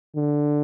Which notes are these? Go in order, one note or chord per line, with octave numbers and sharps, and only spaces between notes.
D3